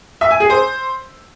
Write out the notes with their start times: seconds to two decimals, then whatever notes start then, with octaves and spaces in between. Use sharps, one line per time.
0.21 E5
0.31 G#5
0.40 G#4
0.50 C5